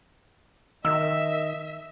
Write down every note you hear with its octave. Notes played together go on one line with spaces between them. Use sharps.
D#3 D#5 E5 E6